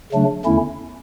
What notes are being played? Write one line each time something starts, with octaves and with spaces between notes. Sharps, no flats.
C#3 F#3 A3 D4
E2 D3 A3 C#4 E4